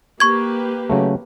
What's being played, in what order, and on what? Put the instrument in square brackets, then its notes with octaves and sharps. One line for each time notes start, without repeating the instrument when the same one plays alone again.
[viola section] A#3 G4 B4 [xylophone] C#6 G#6
[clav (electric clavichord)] C#3 F#3 A3